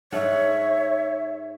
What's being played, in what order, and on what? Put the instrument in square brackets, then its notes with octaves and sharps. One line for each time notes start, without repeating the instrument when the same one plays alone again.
[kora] G#2 A4 F#5 [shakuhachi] C#5 [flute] E5